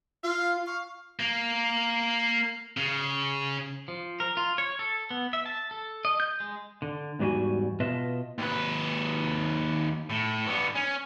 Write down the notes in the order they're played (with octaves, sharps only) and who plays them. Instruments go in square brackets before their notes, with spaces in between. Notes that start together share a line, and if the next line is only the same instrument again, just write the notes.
[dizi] F4 [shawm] F5
[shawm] F5 [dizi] C#6
[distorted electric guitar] A#3
C#3
[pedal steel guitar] F3
A#4
F4
C#5
A4
B3
E5
A5
A4
D#5
G6
G#3
[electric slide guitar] D3
E2 G#2 G3 D4 F#4 G#5
B2 F4 B4 D#5 E5 A5
[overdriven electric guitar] D#2 B4
A2
D3 B3
C#4